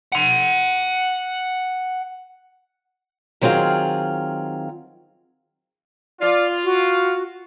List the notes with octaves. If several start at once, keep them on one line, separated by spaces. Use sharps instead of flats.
F#5 C6
D#3 F#3 C4 F4 G#4 F5
F4 D5
F#4